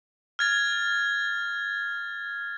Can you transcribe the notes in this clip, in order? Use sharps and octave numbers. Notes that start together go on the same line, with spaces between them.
F6 G#6 A6